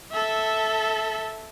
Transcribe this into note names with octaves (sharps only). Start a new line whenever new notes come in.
A4 E5